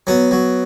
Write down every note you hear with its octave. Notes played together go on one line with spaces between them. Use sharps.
F#3 B3
F#3